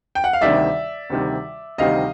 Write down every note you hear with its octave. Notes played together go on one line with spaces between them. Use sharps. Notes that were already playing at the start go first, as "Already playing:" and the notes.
G5
F#5
F5
D2 C3 D#3 G3 D5 E5
D2 C3 D#3 G3
D2 C3 D#3 G3 D#5 F5